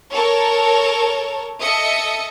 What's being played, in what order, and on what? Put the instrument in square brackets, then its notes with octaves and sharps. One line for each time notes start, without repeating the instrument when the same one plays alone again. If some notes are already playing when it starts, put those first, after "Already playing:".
[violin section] A4 A#4 C#5 A5
A4 D#5 E5 D#6 C#7